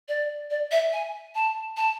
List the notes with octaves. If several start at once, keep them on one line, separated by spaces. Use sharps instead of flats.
D5
D5
E5
G#5
A5
A5